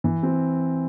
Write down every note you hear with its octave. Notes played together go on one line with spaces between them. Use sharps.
E3
C4